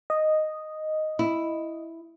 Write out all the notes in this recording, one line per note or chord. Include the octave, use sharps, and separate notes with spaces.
D#5
E4